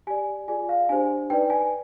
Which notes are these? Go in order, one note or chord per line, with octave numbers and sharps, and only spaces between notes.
G4 D5 G#5
F4 G#4 D5 G#5
F5
D4 G4 C5 G#5
D#4 B4 D5 G5
G#5